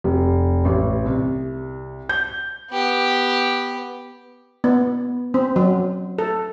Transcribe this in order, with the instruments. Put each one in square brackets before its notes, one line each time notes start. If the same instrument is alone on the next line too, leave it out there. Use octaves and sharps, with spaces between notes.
[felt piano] F1
A1
C2
G6
[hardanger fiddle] B3 G4
[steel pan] B3
C4
F#3
A4